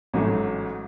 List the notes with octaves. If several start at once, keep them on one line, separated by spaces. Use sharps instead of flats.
A1 G#2 F#3 A3